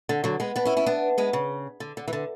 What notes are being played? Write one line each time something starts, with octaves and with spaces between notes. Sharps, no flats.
D3
D3 F#3
G#3 B3
B3 D4
C#4 E4
C#4 E4
B3 D4
G#3 B3
C#3
D3
D3
E3
D3